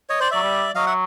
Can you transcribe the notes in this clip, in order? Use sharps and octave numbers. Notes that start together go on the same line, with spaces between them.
C#5 D#5
C5 D5
F#3 D5 E5
G3
F#3 D#5 F5
E5 F#5